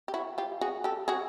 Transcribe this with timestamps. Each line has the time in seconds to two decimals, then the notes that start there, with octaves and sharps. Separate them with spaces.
0.08 G4
0.14 E4 F#4
0.38 F4 G4
0.61 F#4 G#4
0.84 G4 A4
1.08 F#4 G#4